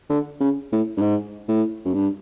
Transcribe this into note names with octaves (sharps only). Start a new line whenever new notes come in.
D3
C#3
A2
G2
G#2
A2
F#2
G2